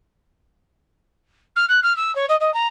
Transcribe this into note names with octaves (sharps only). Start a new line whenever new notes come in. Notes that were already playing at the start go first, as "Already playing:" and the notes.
F6
F#6
F6
E6
C#5
D#5
D#5
A#5